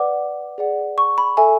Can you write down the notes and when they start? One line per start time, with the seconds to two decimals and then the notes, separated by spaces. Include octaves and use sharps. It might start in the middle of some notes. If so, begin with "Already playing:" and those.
Already playing: B4 D5 F#5 D6
0.58 G#4 D5 F#5
0.98 C#6
1.18 B5
1.37 A4 E5 G#5